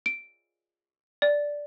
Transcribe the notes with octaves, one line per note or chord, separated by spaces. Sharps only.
D7
D5